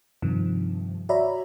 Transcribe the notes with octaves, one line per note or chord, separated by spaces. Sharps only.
G2 C3 D#3 F3
F#4 C#5 D5 E5 A#5 B5